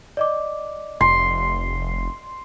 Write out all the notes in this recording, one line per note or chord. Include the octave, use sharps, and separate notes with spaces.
D5 D#5 D6
F1 C6